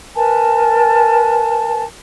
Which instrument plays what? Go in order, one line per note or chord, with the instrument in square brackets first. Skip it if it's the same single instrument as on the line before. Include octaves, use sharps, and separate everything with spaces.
[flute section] A#4 B4 G#5 A5